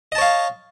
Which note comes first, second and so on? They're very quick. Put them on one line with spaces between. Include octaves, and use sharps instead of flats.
D#5 A5 C#5 F5